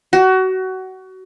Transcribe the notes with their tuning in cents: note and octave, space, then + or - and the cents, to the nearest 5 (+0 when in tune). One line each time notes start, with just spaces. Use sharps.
F#4 +25